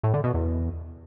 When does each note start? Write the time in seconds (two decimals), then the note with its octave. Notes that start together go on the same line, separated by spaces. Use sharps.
0.03 A2
0.14 D3
0.24 B2
0.34 E2